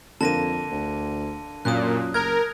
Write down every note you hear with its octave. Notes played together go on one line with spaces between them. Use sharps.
F2 D3 A#3 A5 A#6 D#7
D2
F#2 A#2 D#6 F#6
F#1 A#4 F6 G#6